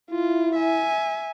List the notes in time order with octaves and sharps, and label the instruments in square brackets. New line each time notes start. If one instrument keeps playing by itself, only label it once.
[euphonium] E4 [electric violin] F4
[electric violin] E5 G#5